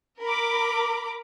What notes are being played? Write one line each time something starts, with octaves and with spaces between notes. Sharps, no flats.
A#4 B5 D6